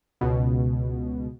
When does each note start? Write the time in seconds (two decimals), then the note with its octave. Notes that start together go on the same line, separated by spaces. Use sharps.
0.21 C#2 B2